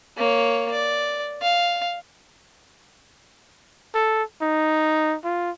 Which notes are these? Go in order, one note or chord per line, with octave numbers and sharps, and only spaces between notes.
A#3 C#5
D5
F5
A4
D#4
F4